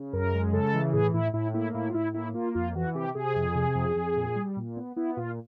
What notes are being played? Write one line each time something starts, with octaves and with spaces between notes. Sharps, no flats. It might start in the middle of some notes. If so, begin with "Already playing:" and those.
Already playing: C#3
F#2 A#4
G#3
C#3 A4
E3
A2 G#4
A2 E4
A2 E4
A#3 E4
A2 E4
F4
A2 E4
A#3 E4
A#3 F4
F2 F4
E3 F#4
C3 G4
C3 G#4
F2
C3
F2
F2
A#2
G3
A#2
B3
B3 E4
A#2 F4